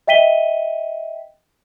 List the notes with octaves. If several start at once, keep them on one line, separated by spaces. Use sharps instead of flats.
D#5 E5 G5 B6 D#7 G7